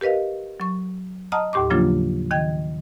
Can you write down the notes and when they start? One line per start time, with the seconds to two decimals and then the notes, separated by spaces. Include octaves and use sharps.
0.01 G4 A#4 B4 D#5 F5
0.60 F#3 C#6
1.32 D#5 F#5 A5 A#5 D#6 F6
1.53 D#2 A2 G4 C6 D6
1.70 C#3 F3 F#3 A#3 D4 F4
2.31 D#3 D#5 G5 G#6